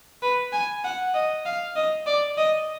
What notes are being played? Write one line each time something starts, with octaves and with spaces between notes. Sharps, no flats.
B4
G#5
F#5
D#5
F5
D#5
D5
D#5